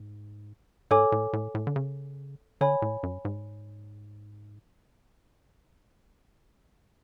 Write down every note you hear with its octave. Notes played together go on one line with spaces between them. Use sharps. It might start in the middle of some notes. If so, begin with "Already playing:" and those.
Already playing: G#2
G#2 A4 C#5 G#5 D6
A2
A2
A2
D3
C#3
D3 C#5 G#5 B5
A2
F#2
G#2